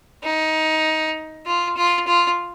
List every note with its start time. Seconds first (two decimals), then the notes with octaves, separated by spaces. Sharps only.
0.23 D#4
1.46 F4
1.77 F4
2.07 F4